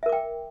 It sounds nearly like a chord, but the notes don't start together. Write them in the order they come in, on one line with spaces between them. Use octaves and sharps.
E5 A#4 D6 G5